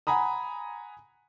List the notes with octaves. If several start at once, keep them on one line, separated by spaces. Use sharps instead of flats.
F#5 G#5 A#5 B5 D#6